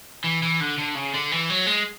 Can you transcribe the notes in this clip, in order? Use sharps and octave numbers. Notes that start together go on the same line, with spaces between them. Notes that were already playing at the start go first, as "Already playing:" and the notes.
E3
E3
D3
D3
C#3
D3
E3
F#3
G#3